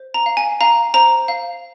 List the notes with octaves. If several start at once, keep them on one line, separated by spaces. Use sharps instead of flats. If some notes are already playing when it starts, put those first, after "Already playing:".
Already playing: C5
A#5
F5
G#5
F5 A#5
C5 A#5
F5